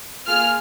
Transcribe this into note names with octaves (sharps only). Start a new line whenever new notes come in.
A#3 F4 G#4 F6